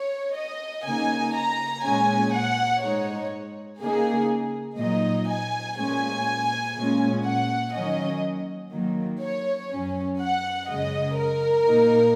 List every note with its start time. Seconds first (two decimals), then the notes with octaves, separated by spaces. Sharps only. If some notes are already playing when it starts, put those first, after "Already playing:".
Already playing: C#5
0.36 D#5
0.85 C#3 A#3 D#4 G#5
1.35 A#5
1.84 A#2 G#3 C#4 G#5
2.33 F#5
2.82 G#2 G#3 D#4 C#5
3.81 C#3 A#3 D#4 G#4
4.78 A#2 F#3 D#4 D#5
5.29 G#5
5.78 A#2 G#3 C#4 G#5
6.76 A#2 G#3 C#4
7.25 F#5
7.74 D#3 F#3 A#3 C#4 D#5
8.72 D#3 F#3 A#3
9.22 C#5
9.71 F#2 F#3 C#4
10.20 F#5
10.69 F#2 C#3 G#3 D#5
11.18 A#4
11.68 A#2 A#3 D#4